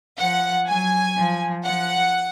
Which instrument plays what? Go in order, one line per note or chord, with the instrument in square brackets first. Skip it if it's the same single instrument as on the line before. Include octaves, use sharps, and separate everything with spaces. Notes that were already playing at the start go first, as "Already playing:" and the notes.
[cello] F3 [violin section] F#5
[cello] F#3 [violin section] G#5
[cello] F3
[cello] F3 [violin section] F#5